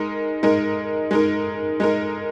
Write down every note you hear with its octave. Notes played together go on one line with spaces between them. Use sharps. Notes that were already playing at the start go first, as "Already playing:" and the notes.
Already playing: G#3 D#4 A#4
G#3 D#4 A#4
G#3 D#4 A#4
G#3 D#4 A#4